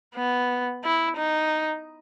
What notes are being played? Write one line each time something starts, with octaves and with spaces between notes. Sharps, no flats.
B3
E4
D#4